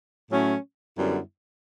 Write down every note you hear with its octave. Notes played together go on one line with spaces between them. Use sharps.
A2 F#3 A3 C#4
F#2 D3 G3 B3 E4